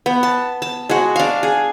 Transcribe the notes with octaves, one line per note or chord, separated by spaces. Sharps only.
B3
A5
A5
G#3 F#4
D4 F5
G#4